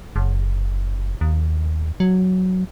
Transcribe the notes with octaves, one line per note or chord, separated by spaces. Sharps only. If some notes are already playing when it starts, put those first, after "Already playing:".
F#1
D#2
F#3